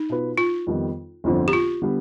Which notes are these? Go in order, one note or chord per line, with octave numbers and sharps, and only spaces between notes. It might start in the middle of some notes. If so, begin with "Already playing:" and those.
Already playing: D#4
B2 B3 F4 B4
F4
F2 D#3 G3 B3
G1 F2 D3 F3 C4
G4
F4
D3 G3 B3